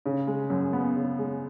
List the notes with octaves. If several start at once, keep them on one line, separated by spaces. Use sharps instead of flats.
C#3
G#3
F#2
B3
C#3
G#3